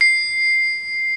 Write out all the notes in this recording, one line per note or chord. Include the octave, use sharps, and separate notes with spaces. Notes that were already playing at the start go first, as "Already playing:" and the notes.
C7